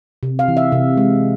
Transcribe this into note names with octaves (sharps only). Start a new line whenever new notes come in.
C3
F5
E3
E5
C3
G#3